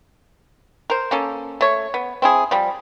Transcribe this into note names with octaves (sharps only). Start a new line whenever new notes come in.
A#4 C5
A#3 C#4 A4
A3 C#5
B3
C4 E4 G#4
F3 G3